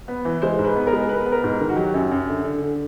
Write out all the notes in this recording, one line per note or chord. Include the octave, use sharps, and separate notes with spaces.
B3
E3
G#3 C5
G#2
B4
B3
A#4
G#3
B3 B4
B3
A#4
G#2
D#3
F#4
F#3 G4
F#2
F#2
D3
D3
D3